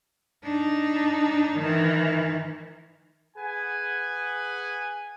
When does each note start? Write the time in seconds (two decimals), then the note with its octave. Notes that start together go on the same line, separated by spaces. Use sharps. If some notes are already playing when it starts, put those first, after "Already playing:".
0.43 D4 D#4
1.57 D#3 E3
3.37 G#4 B4 F#5 G#5